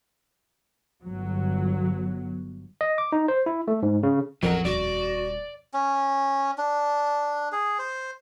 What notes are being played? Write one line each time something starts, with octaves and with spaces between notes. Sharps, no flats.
G1 F#3
D#5
D6
D#4
C5
E4
A3
G#2
C#3
A1 F2 F#3 F#4 A#4
D#1 F#4 D5
C#4
D4
G#4
C5